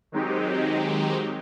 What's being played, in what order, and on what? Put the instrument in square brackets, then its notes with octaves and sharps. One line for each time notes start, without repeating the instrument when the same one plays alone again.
[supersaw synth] D#3 F#3 G#3 C4 D#4 G4